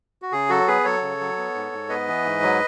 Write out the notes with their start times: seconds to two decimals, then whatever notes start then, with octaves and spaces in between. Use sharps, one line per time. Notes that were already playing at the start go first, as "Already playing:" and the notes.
0.22 F#4
0.32 C#3 G#4
0.49 F#3 F#4 A4
0.67 B3 G#4 B4
0.84 F#3 A4 C#5
1.02 C#3
1.20 F#3
1.37 B3
1.54 G#2
1.72 G#2
1.89 B3 B4 D#5
2.08 E3
2.25 G#2
2.42 F#3